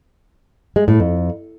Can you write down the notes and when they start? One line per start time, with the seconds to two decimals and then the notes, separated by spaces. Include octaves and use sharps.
0.76 G#3
0.88 A2
1.00 F2